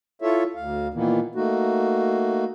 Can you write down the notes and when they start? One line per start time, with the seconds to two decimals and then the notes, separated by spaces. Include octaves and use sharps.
0.22 E4 F4 A4 C#5 E5
0.55 D2 F5
0.94 A#2 D#3 E3 A#3 B3
1.35 A3 A#3 D#4 F#4